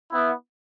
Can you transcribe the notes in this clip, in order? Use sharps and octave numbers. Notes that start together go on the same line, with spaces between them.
B3 E4